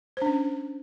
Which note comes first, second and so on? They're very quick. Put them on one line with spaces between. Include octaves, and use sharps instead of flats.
C5 D4 C#4